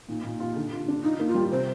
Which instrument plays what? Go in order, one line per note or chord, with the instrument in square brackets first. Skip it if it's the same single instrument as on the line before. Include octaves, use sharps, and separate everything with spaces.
[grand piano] A#2 [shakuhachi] D#4
[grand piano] A#2
F4
D3
F4
D4
[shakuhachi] D#4 [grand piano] F4
[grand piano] A#3
[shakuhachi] F4
[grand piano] G3
[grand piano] C3 [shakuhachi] C5